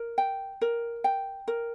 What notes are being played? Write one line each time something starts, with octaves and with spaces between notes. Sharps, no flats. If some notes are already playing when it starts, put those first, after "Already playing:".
Already playing: A#4
G5
A#4
G5
A#4